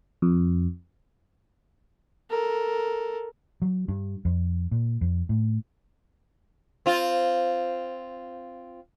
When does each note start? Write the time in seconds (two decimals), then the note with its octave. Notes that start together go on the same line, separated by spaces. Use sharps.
0.22 F2
2.30 A4 A#4
3.62 F#3
3.88 G2
4.25 F2
4.71 A#2
5.01 F2
5.29 A2
6.86 C4 F4